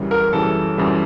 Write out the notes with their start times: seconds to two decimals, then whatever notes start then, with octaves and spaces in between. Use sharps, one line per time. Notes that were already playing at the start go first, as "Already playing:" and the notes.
Already playing: F#2 C#3 E3 G3
0.11 A#4
0.33 F#2 C#3 E3 G3 A4
0.77 F#2 C#3 E3 G3